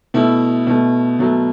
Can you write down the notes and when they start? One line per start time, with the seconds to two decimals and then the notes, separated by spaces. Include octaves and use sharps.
0.14 B2 A3 E4
0.67 B2 A3
1.19 B2 F#3 A3